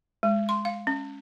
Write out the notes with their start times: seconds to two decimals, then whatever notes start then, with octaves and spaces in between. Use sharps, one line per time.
0.23 G#3
0.49 C6
0.65 F5
0.87 C#4